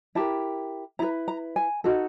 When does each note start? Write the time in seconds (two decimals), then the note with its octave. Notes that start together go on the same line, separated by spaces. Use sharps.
0.15 E4 G4 A#4 A5
0.99 E4 G#4 B4 A#5
1.28 A#5
1.56 G#5
1.84 D#4 F#4 A4